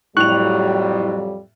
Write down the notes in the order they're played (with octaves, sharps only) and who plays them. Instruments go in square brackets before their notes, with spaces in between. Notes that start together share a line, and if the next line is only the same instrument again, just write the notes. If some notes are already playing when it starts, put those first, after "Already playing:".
[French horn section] F2 F#3 G3 [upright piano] A2 F7 [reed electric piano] C#6 F#6